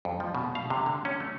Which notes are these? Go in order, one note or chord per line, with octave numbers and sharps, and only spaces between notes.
F2
F3
B2
F5
C3
D3
C#4
A3